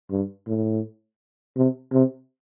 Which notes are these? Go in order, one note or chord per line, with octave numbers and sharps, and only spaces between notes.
G2
A2
C3
C3